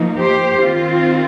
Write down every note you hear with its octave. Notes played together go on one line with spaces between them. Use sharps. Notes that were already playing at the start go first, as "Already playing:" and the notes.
Already playing: F3 A#3 D#4
G4 C5
D#3 C4 F4